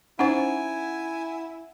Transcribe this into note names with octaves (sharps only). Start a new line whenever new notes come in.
C#4 D#4 E4 C5 F#5 G#5